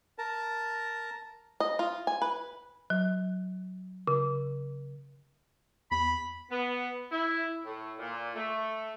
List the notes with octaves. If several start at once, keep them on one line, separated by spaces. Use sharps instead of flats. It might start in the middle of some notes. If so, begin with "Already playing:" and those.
A#4 A5
D#5
F4
G#5
B4
F#3
C#3
E2 B5
B3
E4
A2
A#2
A3